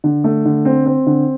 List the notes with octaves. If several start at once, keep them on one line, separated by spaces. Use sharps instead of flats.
D3
A3
D3
C4
C4
D3